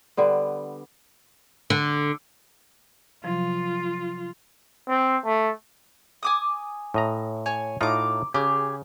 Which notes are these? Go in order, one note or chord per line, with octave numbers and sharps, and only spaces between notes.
D3 G3 B3
D3
C3 F3 F#3 F4
C4
A3
G#5 D6 D#6
A2 D#5 A#5
C#5 G#5
A2 D#4 F4 A#5 D6
C#3 G4 G#4